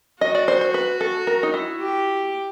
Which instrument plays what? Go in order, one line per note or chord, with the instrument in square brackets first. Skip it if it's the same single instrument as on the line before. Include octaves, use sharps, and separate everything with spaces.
[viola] F#4 [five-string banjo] D#5
[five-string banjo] D5
C5
C5
B4
A4
A#4
D#4
E4
[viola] G4